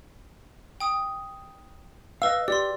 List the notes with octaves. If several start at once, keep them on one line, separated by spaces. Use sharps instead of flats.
G5 D#6
B4 D#5 F5 E6
G4 D5 C6